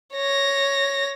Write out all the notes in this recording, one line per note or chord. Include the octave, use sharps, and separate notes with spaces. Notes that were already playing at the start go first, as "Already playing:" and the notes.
C#5 A#6